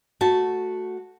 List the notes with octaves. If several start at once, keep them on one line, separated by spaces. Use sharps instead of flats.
A3 F#4 A5